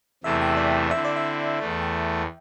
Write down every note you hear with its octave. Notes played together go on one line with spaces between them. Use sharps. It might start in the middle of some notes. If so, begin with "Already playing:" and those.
E2 C3 A3 E4 E5
G5
D5
D3 C4 E4 E5
D5
E5
E2 E3 A3 D5
E5
G5